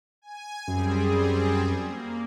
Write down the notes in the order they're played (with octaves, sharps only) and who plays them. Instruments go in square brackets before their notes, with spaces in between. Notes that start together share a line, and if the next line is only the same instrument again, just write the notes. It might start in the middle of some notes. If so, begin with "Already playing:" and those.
[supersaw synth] G#5
[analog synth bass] F#2 [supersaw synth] G3 C4 G#4
[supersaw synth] A#3